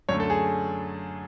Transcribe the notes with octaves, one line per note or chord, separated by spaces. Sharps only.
F#2 D3 A3 C#5
A4
G#4